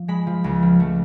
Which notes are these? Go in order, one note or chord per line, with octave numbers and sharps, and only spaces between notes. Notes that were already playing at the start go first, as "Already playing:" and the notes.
Already playing: F3
G#3 B5
F3
C#2
F3
A3